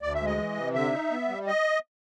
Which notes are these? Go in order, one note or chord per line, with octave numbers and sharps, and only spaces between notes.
D2 D5
E5
G#3 D#5
E3
C3
D3 E5
D#4
B3
G3
D#5